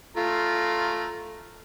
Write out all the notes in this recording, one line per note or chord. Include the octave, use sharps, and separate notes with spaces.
A3 F4 A#5